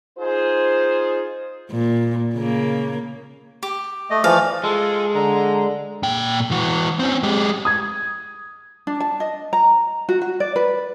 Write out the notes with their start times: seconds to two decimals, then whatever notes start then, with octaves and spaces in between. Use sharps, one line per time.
0.18 D#4 F4 G#4 C5
1.71 A#2
2.35 C#3 A#3
3.63 G4 D6
4.10 A3 D#5
4.24 E3 F3 D5 F5
4.64 G#3 F4 A4
5.15 D3 A#5
6.03 A#2 G5
6.51 E3 F#4
6.99 C4 C#4
7.23 G#3 G4
7.65 D#6 G#6
8.87 D4
9.00 A5
9.20 D#5
9.53 A#5
10.09 F#4
10.22 F#4
10.40 D5
10.56 B4